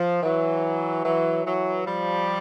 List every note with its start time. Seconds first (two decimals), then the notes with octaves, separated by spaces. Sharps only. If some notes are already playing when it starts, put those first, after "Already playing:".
Already playing: F3
0.23 E3 F#3
1.04 E3 F#3
1.45 E3 F#3
1.86 F3 G3